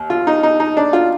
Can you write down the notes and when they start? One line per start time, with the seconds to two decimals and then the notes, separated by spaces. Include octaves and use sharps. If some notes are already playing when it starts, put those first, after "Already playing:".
Already playing: D#2
0.10 F4
0.27 D#4
0.43 D#4
0.60 D#4
0.77 D4
0.93 F4